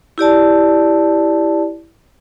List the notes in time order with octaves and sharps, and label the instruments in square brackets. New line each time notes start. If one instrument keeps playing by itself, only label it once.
[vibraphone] E4 G4 D5 A5